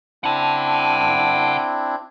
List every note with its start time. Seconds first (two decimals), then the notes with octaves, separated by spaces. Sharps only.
0.24 C4 D4 E4 F#5 A5